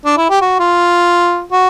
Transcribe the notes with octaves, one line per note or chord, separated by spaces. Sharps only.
D4
E4
G4
F#4
F4
F#4